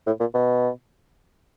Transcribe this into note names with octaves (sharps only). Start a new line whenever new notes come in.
A2
A#2
B2